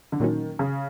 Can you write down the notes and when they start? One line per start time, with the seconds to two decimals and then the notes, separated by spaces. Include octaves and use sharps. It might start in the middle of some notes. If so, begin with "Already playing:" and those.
0.12 D3
0.20 A#2 D#3 F#3 A#3 C#4 F#4
0.59 C#3